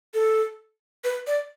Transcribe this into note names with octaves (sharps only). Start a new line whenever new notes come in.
A4
B4
D5